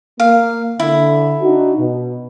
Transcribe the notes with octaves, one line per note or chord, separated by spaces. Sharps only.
A#3 F5
D3 E4
D4 D#4 F#4
B2